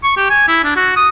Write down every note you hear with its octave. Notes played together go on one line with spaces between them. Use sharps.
C#6
G4
G#5
E4
D4
F#4
D#6